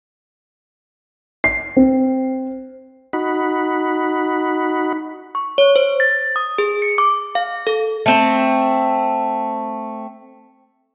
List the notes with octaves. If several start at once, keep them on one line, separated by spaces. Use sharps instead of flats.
C7
C4
D#4 F#4 B5
C#6
C#5
C5
A6
D#6
G#4
C#7
D6
F5
A4
A3 C4